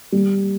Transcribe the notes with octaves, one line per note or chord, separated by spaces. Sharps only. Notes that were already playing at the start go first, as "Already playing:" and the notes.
G3